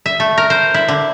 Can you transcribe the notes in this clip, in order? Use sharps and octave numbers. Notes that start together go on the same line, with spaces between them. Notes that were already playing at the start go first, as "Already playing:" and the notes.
E5
A3
A#4
C5
E4
D3